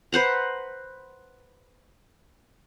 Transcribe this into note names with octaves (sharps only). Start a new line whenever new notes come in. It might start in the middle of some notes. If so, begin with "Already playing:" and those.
B4 C5 F#5 A#5